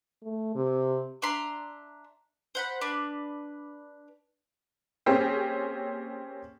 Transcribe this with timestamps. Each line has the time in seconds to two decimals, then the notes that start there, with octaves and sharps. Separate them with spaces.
0.23 A3
0.55 C3
1.22 D4 E5 A#5 C6
2.55 C5 F#5 B5
2.81 D4 B4
5.06 A#3 C4 C#4 G4 G#4